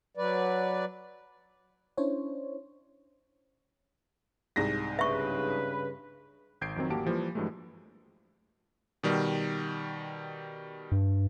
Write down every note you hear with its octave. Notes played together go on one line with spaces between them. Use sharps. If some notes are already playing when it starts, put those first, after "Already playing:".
F#3 B4 D5
C#4 D4 E4 C5 C#5
C2 G#2 A#6
G2 C#3 B4 E5 C#6
G#1 G6 G#6 C7 D7
F2 D#3 F#3 C4
A1 A#3 F#4 G4 A5 D7
E3 F3 G3 A#3
G2 E3 F#3 G#3 A3
B2 D#3 G3
G2